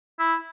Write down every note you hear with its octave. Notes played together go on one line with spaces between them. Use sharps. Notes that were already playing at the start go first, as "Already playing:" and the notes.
E4